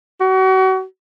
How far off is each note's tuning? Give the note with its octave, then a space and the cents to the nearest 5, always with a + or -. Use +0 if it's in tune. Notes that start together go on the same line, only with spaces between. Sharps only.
F#4 +35